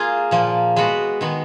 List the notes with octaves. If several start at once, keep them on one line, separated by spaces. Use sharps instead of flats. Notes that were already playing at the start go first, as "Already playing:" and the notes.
Already playing: A#3 F4 G#4
A#2 F3 A#3
G#3 B3 F#4 B4
D#3 G#3 B3